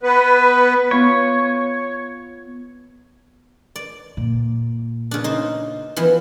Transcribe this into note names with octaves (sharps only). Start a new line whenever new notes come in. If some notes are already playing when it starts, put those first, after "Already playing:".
B3 B4
B3 F4 C#5
D5
A#2
C#3 D4
D#4 C5
E3 F3 B3